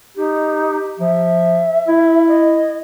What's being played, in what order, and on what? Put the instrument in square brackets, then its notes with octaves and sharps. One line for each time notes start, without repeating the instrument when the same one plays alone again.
[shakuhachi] D#4 [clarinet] G4
[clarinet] F3 [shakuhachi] E5
[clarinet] E4
[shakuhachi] D#5